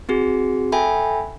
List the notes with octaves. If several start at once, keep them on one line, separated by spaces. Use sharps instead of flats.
C4 F#4 G#4
A4 E5 G5 G#5 B5